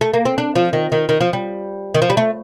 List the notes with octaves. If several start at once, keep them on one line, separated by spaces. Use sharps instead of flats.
A3
A#3
C4
D4
F3
D#3
D#3
D#3
F3
G3
D#3
F3
G3
A3